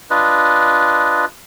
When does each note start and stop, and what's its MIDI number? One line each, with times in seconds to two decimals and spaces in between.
0.10 1.25 62
0.10 1.25 65
0.10 1.25 71
0.10 1.25 75